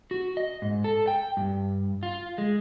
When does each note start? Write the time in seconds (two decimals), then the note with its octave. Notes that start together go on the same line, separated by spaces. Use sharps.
0.11 F#4
0.37 D#5
0.62 G#2
0.84 A4
1.07 G5
1.37 G2
2.03 F4
2.38 G#3